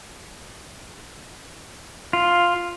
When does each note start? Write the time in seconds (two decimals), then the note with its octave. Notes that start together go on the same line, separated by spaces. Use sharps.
2.13 F4